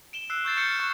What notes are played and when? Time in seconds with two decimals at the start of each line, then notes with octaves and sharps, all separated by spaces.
0.13 D7 E7 G7
0.30 E6 F#6 C7
0.45 C#6 G6 A6 C7
0.57 F6 G6 A6 C#7 E7
0.76 C#6 F#6